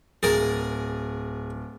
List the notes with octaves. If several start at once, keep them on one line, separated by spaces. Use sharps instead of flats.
D1 G#4 A#4 A6